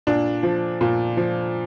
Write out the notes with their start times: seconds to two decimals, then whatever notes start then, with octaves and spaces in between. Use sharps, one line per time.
0.07 A#2 D4
0.43 F3
0.81 A#2
1.17 F3